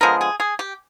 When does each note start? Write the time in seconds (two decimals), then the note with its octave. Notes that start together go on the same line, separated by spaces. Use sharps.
0.01 D3 F3 G#3 B3 A#4
0.21 G#4
0.40 G#4
0.59 G4